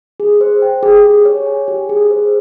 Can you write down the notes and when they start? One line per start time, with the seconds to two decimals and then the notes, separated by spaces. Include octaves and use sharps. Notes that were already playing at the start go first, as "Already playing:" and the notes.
0.20 G#4
0.41 C5
0.62 G5
0.83 G#4
1.04 G4
1.25 C#5
1.46 G#5
1.68 G4
1.89 G#4
2.10 C5